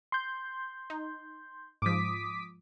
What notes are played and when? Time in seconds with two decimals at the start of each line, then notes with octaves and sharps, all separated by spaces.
0.12 C6 G6
0.90 D#4
1.82 G#2 F3 D6 D#6 B6